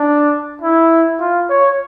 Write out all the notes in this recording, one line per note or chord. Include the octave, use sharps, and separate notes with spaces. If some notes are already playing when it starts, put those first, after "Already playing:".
Already playing: D4
E4
F4
C#5